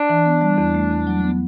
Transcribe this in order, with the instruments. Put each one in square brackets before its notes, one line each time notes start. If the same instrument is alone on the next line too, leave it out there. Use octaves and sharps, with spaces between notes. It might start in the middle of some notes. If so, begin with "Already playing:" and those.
Already playing: [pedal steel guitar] D4
[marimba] E3
B3
G3
E2
A3
E2
F#3
B3